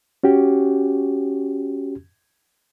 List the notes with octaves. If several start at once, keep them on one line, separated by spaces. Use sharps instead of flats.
C#4 F#4 G4